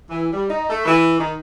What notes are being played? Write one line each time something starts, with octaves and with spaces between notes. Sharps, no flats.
E3
G3
D#4
A3
E3
D#3